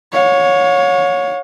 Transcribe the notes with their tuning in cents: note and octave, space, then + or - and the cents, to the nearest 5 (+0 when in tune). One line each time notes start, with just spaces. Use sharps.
C#5 +0 F5 +45